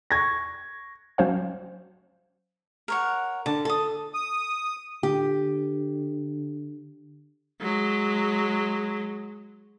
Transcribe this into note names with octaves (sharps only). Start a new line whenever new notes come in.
C#6 G#6 A#6
F#3 C#4 C5 F5
A#4 C#5 F#5
D3 A5
A4 A5 D#6
D#6
D3 G4
F#3 G#3